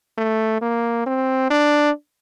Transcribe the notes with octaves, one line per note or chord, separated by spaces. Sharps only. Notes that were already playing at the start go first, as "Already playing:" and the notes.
A3
A#3
C4
D4